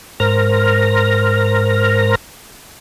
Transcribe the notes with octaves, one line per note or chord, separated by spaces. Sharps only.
G#2 A#4 C5 F6 A#6